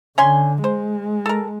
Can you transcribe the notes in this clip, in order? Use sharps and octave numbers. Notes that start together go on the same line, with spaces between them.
D3 C#4 G#5 C6
G#3 C5
A4 A#4